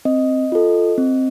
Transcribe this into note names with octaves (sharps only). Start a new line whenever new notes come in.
C4 D#5
F4 A4
C4